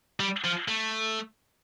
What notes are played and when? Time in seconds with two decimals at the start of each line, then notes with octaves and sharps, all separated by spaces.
0.20 G3
0.44 F3
0.68 A3